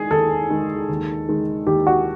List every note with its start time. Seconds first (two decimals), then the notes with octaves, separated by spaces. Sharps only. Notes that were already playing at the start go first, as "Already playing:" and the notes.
Already playing: D#3 G#3 G#4
0.11 D#2 A4
0.50 D#3 G#3
0.89 D#2
1.29 D#3 G#3
1.66 D#2 G4
1.87 F#4